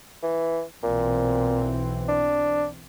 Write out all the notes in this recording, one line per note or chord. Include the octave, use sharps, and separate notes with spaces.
E3
B1 A#2 E3 C4
D4